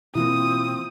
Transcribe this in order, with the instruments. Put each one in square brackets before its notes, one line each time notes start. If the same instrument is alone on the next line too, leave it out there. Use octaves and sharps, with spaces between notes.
[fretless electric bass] B2 E3 A#3 [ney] C4 [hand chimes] E4 F4 [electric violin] D#6